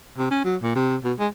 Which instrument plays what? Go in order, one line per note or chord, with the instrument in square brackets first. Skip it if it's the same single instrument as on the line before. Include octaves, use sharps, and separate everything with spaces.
[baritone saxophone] C3
C#4
F#3
A#2
C3
B2
G#3